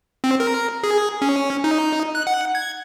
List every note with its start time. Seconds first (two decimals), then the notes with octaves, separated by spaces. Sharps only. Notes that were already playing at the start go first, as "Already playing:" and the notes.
0.24 C4
0.40 A#4
0.83 G#4
1.22 C#4
1.64 D#4
2.15 F#6
2.27 F#5
2.55 G#6